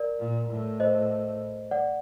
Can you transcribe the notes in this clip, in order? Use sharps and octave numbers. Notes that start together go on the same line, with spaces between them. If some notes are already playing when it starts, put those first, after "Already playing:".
Already playing: A#4 D5
A#2
A2
C5 D#5
D5 F#5